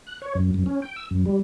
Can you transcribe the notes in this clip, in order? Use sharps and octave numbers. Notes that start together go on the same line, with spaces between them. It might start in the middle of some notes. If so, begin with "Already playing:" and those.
F#6
C#5
F#2
F#2
C#4
G5
E6
F#2
G3